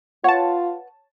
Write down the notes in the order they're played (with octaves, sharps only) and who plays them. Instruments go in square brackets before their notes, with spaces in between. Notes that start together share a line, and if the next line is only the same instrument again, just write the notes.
[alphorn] F4 [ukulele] B4 F#5 [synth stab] C#5 A5